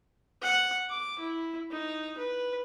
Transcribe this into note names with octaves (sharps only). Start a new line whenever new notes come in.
F#5
D6
E4
D#4
B4